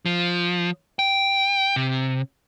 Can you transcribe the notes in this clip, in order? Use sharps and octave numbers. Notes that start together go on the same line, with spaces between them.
F3
G5
C3